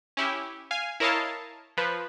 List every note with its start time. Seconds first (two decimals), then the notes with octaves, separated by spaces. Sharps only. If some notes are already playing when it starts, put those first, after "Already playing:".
0.17 C#4 E4 G4
0.71 F5 G#5
1.00 E4 A#4 C#5 D#5 F5 A5
1.77 F3 B4